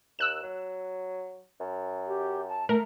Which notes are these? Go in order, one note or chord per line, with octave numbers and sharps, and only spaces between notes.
D#2 E6 F#6 E7
F#3
F#2
G4
A5
A3 A#4 A#5